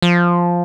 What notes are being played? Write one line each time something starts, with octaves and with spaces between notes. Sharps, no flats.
F3